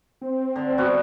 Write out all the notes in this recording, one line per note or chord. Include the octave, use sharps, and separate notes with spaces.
C4
D3
B2 G3 F#4